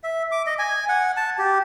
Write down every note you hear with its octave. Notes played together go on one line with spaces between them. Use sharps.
E5
D6
D#5
G#5
F#5
A5
G4